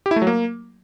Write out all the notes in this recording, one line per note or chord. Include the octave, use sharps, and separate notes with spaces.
G4
E4
A3
F#3
A#3